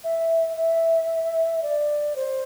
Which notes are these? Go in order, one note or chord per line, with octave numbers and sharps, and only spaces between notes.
E5
E5
D5
C5